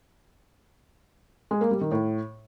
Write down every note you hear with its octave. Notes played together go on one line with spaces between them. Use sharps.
G#3
A#3
G3
D#3
A2